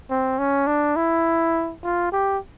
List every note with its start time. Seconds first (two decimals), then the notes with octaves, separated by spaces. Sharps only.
0.10 C4
0.39 C#4
0.67 D4
0.96 E4
1.84 F4
2.12 G4